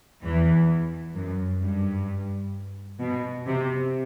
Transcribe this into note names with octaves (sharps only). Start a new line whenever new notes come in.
E2 E3
F#2
G2
B2
C3